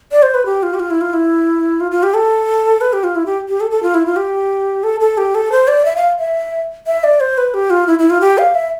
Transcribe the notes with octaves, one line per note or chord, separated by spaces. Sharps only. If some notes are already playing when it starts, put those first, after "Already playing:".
D5
C5
B4
G4
F4
G4
F4
E4
F4
E4
F4
F4
G4
A4
B4
G4
F4
E4
G4
G4
A4
A4
F4
E4
F4
G4
A4
A4
G4
A4
C5
D5
E5
F5
E5
E5
D5
C5
B4
G4
F4
E4
E4
F4
G4
F5
E5